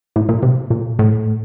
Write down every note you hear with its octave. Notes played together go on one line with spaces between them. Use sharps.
A2
A#2
C3
A#2
A2